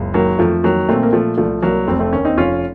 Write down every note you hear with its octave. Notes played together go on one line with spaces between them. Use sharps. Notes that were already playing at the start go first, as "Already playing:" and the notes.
Already playing: F#1 C#2
D#3 F#3 A#3
F2 F3 A3
D#3 F#3 A#3
A#2 A3 C4
A#3
A#2 F3 A3
C2 F3 A3
C2 F#3 A#3
F1 A3 C4
A3 C4
D#2 A#3 C#4
C4 D#4
F1 C#4 F4